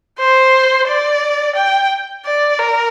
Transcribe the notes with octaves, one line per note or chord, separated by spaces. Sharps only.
C5
D5
G5
D5
A#4